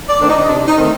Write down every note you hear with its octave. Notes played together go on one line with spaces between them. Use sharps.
D5
D#3 A3 C4 D4
D#4
D#4
C3 D4
D#4
D#3 A3 C4